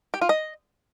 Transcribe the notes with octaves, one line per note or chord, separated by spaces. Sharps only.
G4
F4
D#5